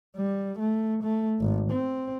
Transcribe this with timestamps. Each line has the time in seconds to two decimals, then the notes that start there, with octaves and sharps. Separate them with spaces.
0.17 G3
0.59 A3
1.03 A3
1.40 G#1
1.71 C4